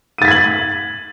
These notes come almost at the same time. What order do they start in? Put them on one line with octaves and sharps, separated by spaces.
D#7 A6 B6 G#6 F#7